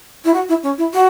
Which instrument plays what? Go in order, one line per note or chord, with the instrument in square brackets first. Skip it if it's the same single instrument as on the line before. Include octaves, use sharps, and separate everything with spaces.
[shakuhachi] E4
F#4
E4
C#4
E4
F#4